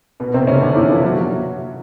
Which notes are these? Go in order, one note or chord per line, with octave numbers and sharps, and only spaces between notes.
B2 B3
C3 C4
C#3 C#4
D3 D4
E3 E4
F3 F4
F#3 F#4
F#3 F#4